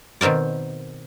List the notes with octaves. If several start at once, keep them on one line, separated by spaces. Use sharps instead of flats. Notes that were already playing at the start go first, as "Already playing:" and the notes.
B2 D#3 C4 A#4 D5